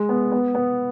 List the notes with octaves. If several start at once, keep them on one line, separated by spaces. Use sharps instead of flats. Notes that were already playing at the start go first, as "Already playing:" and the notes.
Already playing: G#3
B3
B3
B3